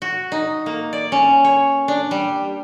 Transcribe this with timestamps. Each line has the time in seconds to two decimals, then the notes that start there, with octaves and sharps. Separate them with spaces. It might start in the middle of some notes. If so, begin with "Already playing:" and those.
0.02 F#4
0.32 D#4
0.66 A#3
0.93 D5
1.12 C#4
1.44 C#5
1.88 D4
2.11 G3